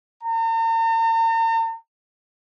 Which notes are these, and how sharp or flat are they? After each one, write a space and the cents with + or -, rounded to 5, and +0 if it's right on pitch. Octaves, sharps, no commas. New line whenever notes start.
A#5 -45